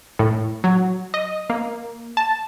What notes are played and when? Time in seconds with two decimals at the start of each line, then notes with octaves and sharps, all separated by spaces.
0.19 A2
0.64 F#3
1.14 D#5
1.50 A#3
2.17 A5